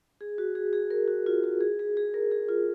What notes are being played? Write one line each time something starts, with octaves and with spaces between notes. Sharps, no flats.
G#4
F#4
G#4
G#4
A#4
F#4
F4
F#4
G#4
G#4
G#4
A#4
G#4
F4